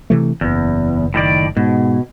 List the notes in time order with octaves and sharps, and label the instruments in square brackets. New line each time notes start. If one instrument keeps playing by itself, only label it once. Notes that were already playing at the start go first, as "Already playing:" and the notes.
[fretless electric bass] C3 E3 A3
[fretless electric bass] F#1 [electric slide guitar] E2
[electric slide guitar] A2 D#3 D5
[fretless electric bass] G#2 [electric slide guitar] B2